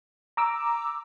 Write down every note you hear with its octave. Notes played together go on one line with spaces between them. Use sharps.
A#5 D6 E6